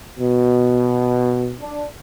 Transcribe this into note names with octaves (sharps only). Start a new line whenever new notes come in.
B2
D4